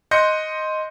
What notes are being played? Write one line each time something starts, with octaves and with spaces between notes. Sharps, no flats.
D#5 C6 F#6 G6 A#6 C#7